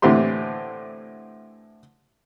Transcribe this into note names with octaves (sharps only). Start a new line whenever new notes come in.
A2 D3 E3 C4 G4 C6